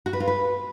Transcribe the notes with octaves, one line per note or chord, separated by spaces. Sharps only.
F#4
B4
F4
B4